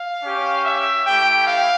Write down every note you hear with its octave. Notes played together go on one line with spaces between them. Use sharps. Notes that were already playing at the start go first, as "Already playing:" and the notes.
Already playing: F5
C#4 G4
E5
A3 E4 G4 G5
F5